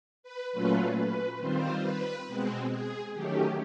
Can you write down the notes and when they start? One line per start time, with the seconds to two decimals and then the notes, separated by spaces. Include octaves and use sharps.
0.23 B4
0.52 A#2 F#3 A3 C#4 F4 B4
0.96 B4
1.39 D#3 G3 C4 F4 C5
1.82 B4
2.27 B2 G#3 C4
2.70 G#4
3.14 D#3 F#3 A3 C#4 G4